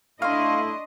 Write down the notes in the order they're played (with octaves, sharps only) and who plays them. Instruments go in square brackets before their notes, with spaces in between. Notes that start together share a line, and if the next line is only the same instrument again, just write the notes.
[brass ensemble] A3 E4 [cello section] D4 D#5 [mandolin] F5 [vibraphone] C6 C#6